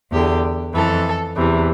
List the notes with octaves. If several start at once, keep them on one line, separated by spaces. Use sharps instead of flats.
E2 D3 G4
F2 E3 A4
E2 C3 E3